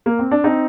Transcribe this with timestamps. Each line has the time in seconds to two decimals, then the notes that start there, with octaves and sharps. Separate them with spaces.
0.06 A#3
0.19 C4
0.31 D4
0.44 C4 D#4